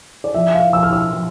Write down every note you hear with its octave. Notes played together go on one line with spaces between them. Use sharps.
D5
F3 E5
F5
F3 E6
F6
E6
F3